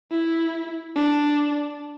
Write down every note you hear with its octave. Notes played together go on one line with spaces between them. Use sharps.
E4
D4